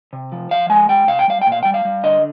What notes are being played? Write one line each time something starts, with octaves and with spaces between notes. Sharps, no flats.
C3
F3
F3 F5
G#3 G#5
G#3 G5
C3 F5
G5
G3 F5
A#2 G5
F5
G3 G5
F5
G3
D3 D#5